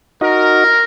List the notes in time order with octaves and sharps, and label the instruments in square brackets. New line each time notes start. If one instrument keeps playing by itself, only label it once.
[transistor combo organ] D#4 F#4 D#5 [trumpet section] A#4